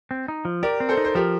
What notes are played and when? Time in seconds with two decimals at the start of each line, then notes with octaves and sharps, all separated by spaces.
0.11 C4
0.28 D#4
0.45 F3
0.63 G4 A#4 D5
0.80 C4
0.89 A4 C5
0.97 D#4
1.05 C5
1.15 F3 G4 A#4